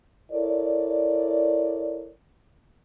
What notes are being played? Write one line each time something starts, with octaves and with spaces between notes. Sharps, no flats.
E4 A4 A#4 C#5 D5